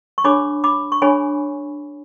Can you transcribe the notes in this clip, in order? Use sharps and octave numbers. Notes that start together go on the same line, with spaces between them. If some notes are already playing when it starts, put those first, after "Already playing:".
C#6
D4 G#4 C#5 B5 D6
B5 D6
C#6
D4 G#4 C#5 G#5 B5